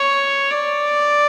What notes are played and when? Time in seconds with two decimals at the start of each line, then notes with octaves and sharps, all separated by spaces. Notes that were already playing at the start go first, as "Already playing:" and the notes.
Already playing: C#5
0.51 D5